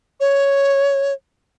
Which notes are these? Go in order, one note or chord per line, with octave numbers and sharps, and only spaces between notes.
C#5